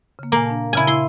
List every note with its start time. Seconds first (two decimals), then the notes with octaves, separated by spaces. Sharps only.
0.19 C#3 A#3
0.32 A#2 A#3 G#5
0.46 D4 A5
0.73 A#2 C#3 E4 G#5
0.87 E4 C6 E6